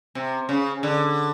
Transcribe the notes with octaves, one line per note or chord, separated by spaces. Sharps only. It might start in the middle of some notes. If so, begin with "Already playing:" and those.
C3
C#3
D3